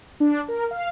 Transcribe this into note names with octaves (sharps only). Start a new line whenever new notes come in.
D4
A#4
F5